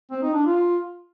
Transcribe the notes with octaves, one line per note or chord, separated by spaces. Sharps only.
C4
D#4
D4
F4